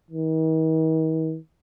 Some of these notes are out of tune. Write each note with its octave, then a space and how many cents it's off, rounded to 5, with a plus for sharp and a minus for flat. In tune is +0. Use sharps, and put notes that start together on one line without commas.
D#3 +45